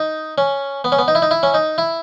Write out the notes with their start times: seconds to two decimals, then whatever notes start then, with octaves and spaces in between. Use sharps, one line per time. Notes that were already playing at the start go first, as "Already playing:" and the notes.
Already playing: D#4
0.38 C#4
0.84 B3
0.92 C#4
0.98 B3
1.08 D#4
1.15 E4
1.22 D#4
1.31 E4
1.43 C#4
1.54 D#4
1.78 E4